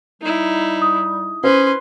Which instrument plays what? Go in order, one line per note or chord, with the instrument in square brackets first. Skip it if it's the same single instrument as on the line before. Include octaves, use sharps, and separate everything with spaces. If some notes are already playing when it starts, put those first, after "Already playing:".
[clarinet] G3 [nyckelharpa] D#4 E4
[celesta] D#6
[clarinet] C#4 [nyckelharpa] B4 C6 [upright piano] C5